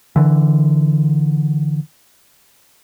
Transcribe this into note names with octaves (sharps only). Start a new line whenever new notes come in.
D3 E3